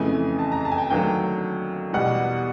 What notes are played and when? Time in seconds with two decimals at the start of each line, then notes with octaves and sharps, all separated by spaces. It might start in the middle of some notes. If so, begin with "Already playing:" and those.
Already playing: F2 C#3 E3 A3 G#5
0.39 A5
0.52 A#5
0.65 A5
0.72 G#5
0.78 G5
0.90 D#2 D3 F#3 A3 G5
1.93 E2 B2 G3 F#5